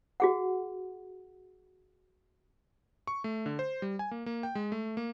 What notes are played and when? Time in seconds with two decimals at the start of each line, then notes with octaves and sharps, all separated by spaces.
0.20 F#4 G#4 F#5
3.07 C#6
3.24 A3
3.46 D3
3.59 C5
3.82 G3
3.99 G#5
4.11 A#3
4.26 A#3
4.43 G5
4.55 G#3
4.72 A3
4.97 A#3